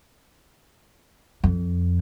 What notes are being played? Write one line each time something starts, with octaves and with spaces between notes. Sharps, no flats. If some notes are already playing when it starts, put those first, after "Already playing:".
F2